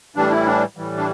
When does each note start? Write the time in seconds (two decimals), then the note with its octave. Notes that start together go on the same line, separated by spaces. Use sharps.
0.15 A2 E3 G3 D4
0.31 E4
0.47 D4
0.77 A2 E3 G3
0.98 D4